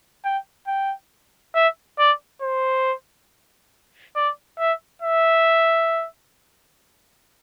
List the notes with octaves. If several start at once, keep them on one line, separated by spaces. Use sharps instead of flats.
G5
G5
E5
D5
C5
D5
E5
E5